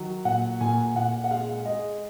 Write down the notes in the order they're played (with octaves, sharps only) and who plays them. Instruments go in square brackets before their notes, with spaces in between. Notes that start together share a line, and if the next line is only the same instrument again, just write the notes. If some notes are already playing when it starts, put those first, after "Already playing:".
Already playing: [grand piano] D#3 F#3
[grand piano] A#2 [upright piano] F#5
[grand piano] A#2 [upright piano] G#5
[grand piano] A#2 [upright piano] F#5
[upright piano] F#5
[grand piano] G#3 [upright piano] F5
[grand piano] G#3 [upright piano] D#5